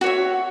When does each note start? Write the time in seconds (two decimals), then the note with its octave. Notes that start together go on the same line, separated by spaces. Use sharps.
0.01 F#4
0.04 C#5
0.06 E5